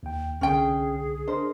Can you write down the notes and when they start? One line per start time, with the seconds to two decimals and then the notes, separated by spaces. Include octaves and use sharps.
0.03 D#2 G5
0.41 C2 D3 C#4 G#4 G5
1.28 D4 A#4 C5 D#5